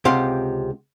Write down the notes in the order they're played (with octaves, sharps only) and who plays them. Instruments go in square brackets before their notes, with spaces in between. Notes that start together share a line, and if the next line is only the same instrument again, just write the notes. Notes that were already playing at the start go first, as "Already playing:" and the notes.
[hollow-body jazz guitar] C#2 C3 G4 F5 F#5 C6